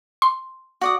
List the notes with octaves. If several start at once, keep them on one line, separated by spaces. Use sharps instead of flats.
C6
F#4 D5 D#6